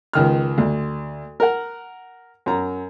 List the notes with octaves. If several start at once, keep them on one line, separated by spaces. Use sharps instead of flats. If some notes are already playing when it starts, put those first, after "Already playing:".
C#2 D#3 F6
D2
A#4 F#5
F#2 A#5